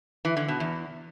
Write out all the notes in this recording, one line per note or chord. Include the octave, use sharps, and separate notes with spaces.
E3
D3
B2
E2